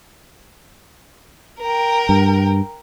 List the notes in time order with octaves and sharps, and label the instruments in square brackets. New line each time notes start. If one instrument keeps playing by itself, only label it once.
[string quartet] A#4 G5
[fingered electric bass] G2